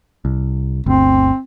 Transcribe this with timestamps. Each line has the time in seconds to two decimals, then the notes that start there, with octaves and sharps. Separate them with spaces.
0.25 C2
0.86 G1 D2 C4